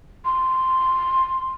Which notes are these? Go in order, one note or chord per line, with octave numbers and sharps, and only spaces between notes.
C6